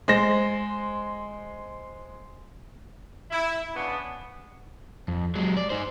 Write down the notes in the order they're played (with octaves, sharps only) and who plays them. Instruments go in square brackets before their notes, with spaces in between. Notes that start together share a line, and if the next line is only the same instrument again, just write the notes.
[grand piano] G#3 C5 A#6
[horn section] E4
C#3 B3 D4
[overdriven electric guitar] F2
F#3 G#3
D5
D#4 C5